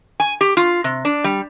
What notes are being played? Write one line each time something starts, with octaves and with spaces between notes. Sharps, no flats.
G#5
G4
F4
C3
D4
G3